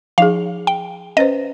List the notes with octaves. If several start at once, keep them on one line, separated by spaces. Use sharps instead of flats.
F3 D#4 G#4 F5
G5
C#4 B4 C5 D#5